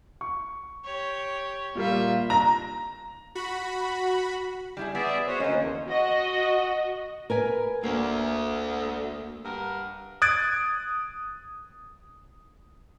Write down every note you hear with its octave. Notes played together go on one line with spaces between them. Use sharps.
C#6
G4 C#5
A#2 G3 A#3 F4 E5
A#5
F#4 B5
G3 E4 G#4
B3 G#4 D5 E5
F#4 C5 C#5
D2 A#3 C#4 C5 D#5
E2
F#4 D#5
A#4 B4 G#5
D2 A#3
G2 A#4 F#5
D#6 F#6 G#6 A6 D7